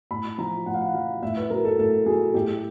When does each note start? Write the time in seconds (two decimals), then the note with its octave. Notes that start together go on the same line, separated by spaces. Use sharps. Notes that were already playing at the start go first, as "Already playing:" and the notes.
0.11 A2 B5
0.38 F3 A#5
0.66 A2 F#5
0.74 F5
0.81 F#5
0.94 F3 F5
1.23 A2 E5
1.37 B4
1.50 F#3 A#4
1.65 A4
1.79 A2 A4
2.06 F#3 G#4
2.34 A2 G4